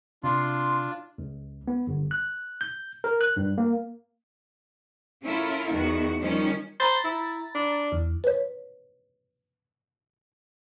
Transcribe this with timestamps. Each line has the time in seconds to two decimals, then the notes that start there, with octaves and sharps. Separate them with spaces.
0.23 C3 D4 F4 C6
1.18 C#2
1.68 B3
1.87 G1
2.11 F#6
2.61 G6
3.04 A#4
3.21 F#6
3.37 G2
3.58 A#3
5.23 C#4 E4 F4 A4 A#4
5.71 E2 D#3 F#4
6.20 D#3 F3 G3 C#4 D#4
6.80 C5 A#5 B5 A6
7.04 E4
7.55 D4
7.92 E2
8.24 B4 C#5